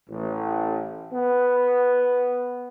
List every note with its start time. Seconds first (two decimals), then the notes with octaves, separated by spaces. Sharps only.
0.10 A1
1.13 B3